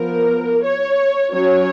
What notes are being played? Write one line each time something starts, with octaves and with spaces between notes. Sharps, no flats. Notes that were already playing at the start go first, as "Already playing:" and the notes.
Already playing: F3 B3 A#4
C#5
F#3 C#4 C#5